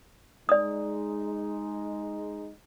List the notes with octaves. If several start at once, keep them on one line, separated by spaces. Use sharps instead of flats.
G#3 D#4 D5 D#6